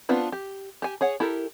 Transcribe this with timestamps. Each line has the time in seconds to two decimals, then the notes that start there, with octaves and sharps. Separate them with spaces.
0.09 B3 C4 D4 F4 B4
0.32 G4
0.82 G4 G#5
1.01 G#4 C#5 F#5
1.20 E4 G4 A4 A#4